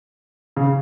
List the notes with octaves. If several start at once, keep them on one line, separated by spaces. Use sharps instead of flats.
C#3